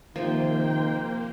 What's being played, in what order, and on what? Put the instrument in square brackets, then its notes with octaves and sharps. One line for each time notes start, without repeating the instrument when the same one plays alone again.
[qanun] C3 F3 [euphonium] D#3 [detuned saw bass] A#3 [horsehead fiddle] C5 G5